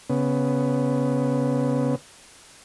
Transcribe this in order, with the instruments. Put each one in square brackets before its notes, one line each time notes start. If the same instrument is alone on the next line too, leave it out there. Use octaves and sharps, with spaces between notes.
[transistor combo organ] C#3 B3